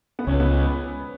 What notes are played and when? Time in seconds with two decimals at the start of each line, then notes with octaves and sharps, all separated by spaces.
0.19 B3
0.27 C#2 C#4
0.40 B3